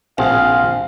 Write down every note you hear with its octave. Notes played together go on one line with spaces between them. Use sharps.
A#1 C4 G#4 F5 F#5